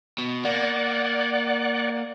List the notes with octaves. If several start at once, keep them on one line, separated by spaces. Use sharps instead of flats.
B2
A#3 D5 F#5